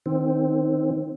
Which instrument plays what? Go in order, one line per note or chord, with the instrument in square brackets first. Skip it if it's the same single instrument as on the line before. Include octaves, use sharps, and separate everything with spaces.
[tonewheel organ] D#3 C4